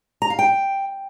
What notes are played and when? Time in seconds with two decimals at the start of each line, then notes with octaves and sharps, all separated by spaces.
0.22 A#5
0.30 F5
0.39 G5